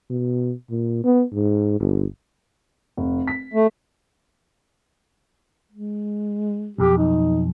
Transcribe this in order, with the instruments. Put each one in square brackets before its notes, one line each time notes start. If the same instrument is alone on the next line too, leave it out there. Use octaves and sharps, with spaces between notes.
[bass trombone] B2
A#2
B3
G#2
G1
[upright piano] F1
B6
[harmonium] A3
[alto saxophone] G#3
[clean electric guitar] B1 F2 [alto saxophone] G4
[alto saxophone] D#4